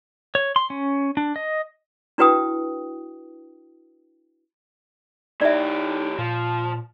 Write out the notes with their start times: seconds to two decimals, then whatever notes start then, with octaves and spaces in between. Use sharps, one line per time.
0.35 C#5
0.56 C6
0.70 C#4
1.17 D4
1.36 D#5
2.18 D4 E4 F#4 B4 G5 D#6
5.41 E3 D#4 G4 D5 E5
6.19 A#2 F3